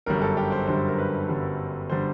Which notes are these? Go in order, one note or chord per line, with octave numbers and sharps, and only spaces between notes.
G1 F#2 D3 G3 A#4
A4
G4
C5
G1 F#2 D3 G3 C5
A#4
B4
G1 F#2 D3 G3
D3 G3 C5